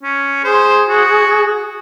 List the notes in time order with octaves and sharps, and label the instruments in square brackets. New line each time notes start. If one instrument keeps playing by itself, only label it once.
[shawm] C#4
[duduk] G#4 [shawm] C5
[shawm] F#4